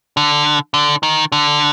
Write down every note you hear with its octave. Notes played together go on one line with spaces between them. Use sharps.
D3
D3
D#3
D3